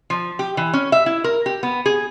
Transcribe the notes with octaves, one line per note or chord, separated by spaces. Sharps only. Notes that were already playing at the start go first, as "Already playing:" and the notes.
F3
G4
E3
C#4
E5
E4
A#4
G4
B3
G#4